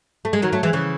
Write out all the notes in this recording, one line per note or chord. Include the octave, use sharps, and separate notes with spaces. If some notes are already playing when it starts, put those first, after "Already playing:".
A3
G#3
D#3 F#3
F#3 A3
E3 G#3
C#3 E3